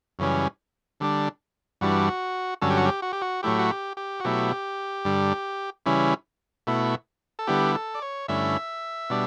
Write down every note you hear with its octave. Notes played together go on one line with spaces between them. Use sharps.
F#2 C#3 E3 G3 C#4
D3 G3 D4
G2 E3 G3 D4 F#4
G2 D3 F#3 C#4 A4
G4
F#4
G4
F#4
G4
F#4
A2 F#3 A3 E4 G4
F#4
G4
G4
F#4
B2 F#3 A3 E4 G4
G2 D3 G3
C#3 E3 G3 C#4 E4
B2 A3 E4
A4
D3 G3 B3 E4 G4
A4
D5
C#5
G2 D3 A3 C#4 E4 E5
B2 G3 D4